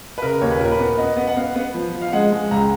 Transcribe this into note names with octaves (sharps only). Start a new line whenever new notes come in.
B4
C#3 A#4
D#2 C#5
B4
A#2 A#4
B4
B3
B3 D#5
B3
F#5
B3 F5
B3
F3
F3
F5
G#3 F#5
G#3
C#2 A#5